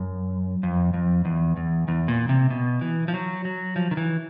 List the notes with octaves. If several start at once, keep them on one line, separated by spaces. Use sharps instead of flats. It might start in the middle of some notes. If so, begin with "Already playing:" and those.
Already playing: F#2
F2
F2
E2
E2
E2
A#2
C3
B2
E3
F3
F#3
F#3
F3
D#3
E3